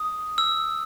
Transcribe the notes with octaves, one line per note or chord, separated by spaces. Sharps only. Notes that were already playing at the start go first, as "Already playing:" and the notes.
Already playing: D#6
E6